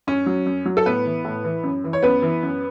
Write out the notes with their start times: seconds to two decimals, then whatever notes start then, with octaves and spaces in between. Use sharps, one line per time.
0.07 F#2 C#4
0.26 F#3
0.46 F#2
0.66 F#3
0.77 A4
0.86 A2 B3 B4
1.05 E3
1.24 A2
1.44 E3
1.63 F#2
1.84 E3
1.93 C#5
2.03 F#2 B3 B4
2.22 E3
2.43 F#2